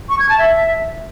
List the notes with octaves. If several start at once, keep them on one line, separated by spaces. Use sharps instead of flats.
C#6
G#6
A5
E5